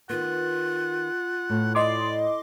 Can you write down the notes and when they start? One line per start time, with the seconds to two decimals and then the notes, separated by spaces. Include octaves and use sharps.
0.10 D#3 B3 F4 F#5
1.50 A2
1.75 D5 D#5 C6 D6